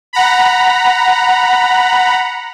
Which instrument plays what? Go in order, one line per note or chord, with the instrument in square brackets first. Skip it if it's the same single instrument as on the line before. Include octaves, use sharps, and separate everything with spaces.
[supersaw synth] F#5 A#5 B5